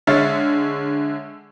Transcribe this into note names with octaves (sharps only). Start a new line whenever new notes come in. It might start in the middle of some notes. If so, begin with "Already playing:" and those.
D3 G#3 C#5 E5 F6 A6